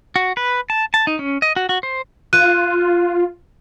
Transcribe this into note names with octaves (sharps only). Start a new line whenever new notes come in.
F#4
B4
A5
A5
D#4
C#4
D#5
F#4
F#4
C5
F4 F#6 D#7